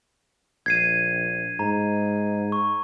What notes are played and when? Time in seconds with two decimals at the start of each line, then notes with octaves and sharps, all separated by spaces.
0.66 A#1 G#6 C7 D#7
1.59 G#2 A#5
2.52 C#6